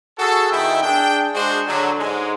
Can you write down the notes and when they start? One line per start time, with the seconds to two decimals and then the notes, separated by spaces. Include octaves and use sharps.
0.18 F#4 G#4 A4
0.52 B2 D#3 E4 E5 G5
0.83 D4 G#4 G5
1.34 G#3 D4 F#4 G#4 C5
1.67 D3 F#3
1.98 G#2 G#3